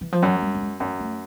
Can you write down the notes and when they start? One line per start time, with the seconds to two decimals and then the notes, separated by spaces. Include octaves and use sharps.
0.01 E3
0.12 F3
0.23 F#2 F#3
0.42 G3
0.55 G3
0.61 G#3
0.80 F#2 A3
1.00 A3